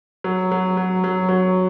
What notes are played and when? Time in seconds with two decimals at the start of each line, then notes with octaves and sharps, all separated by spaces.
0.24 F#3
0.52 F#3
0.77 F#3
1.04 F#3
1.29 F#3